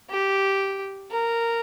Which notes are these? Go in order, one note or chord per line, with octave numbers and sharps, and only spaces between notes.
G4
A#4